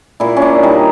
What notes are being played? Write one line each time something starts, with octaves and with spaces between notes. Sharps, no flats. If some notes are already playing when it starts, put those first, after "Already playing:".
A#2 E4
C#4
D4
G3 D#4